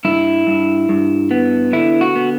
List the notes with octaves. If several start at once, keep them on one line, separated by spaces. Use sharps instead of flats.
G2 E4
G2
G2
B3
D3 E4
F#4
B3